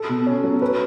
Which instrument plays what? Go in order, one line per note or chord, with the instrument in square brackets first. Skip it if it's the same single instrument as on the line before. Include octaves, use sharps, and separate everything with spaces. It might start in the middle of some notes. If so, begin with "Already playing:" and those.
Already playing: [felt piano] A4
[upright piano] B2
C#4
F#3
[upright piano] C#4 [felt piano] B4